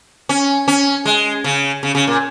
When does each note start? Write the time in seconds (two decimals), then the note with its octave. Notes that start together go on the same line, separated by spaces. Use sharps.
0.29 C#4
0.68 C#4
1.05 G#3
1.44 C#3
1.83 C#3
1.95 C#3
2.07 A#2